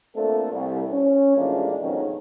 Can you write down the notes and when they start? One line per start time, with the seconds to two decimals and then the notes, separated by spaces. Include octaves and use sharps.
0.16 A3 A#3 C4 D4 F4 A4
0.53 C2
0.90 C#4
1.36 A1 F3 G#3 A#3 D4
1.81 F2 G#2 B2 D#3 F#3 C#4